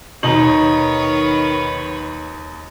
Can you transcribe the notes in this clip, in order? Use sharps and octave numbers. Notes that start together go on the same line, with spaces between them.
D#2 B2 D#3 D#4 B4 C#5 F#7